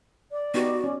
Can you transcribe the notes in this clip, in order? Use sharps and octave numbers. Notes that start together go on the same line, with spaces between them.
D5
B3 D#4 F#4 G4
C#4